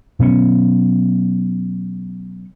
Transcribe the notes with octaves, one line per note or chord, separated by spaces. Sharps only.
B2 F#3 B3 C#4